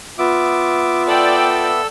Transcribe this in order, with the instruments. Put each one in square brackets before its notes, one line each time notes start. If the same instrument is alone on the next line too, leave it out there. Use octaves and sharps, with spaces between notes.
[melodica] B3 E5 [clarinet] F4 [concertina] D6
[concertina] A4 E6 [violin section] D5 G5